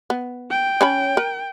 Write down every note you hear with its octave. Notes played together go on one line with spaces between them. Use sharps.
B3
G5
C#4 C#5 B5
A#4